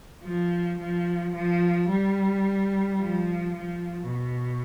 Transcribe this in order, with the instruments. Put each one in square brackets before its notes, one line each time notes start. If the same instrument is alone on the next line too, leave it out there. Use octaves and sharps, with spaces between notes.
[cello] F3
F3
F3
G3
F3
F3
B2